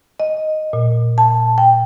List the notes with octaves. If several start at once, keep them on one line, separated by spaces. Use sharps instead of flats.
D#5
A#2
A5
G5